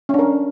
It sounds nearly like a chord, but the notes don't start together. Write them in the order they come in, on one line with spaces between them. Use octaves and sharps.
C#4 D4 A#4